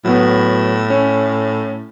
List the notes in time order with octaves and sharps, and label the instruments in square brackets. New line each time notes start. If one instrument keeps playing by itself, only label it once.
[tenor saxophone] A2 [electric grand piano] F#3 B3
[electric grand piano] C#4